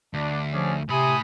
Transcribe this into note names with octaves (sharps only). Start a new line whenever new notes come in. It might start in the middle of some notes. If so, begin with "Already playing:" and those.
D2 D4
F3 C#4 G#4 D5
A2 C3 G#5 B5 D#6